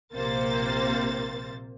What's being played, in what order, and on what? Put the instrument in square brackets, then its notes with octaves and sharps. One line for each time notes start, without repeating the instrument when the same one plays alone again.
[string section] A#1 C3 A#3 C5 A6